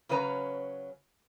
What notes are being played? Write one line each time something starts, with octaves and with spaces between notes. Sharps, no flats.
C#3 F#3 C#4 B4 D#5 A#5